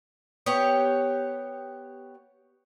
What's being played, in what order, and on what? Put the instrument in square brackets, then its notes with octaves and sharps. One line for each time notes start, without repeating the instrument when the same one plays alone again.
[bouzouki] B3 G4 C#5